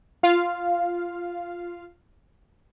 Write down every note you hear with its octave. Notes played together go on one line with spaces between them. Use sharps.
F4 F5